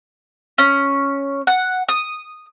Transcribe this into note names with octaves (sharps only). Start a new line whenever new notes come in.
C#4
F#5
D#6